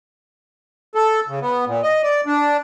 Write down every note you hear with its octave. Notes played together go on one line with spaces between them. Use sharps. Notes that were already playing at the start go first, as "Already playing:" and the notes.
A4
C#3
B3
A#2
D#5
D5
D4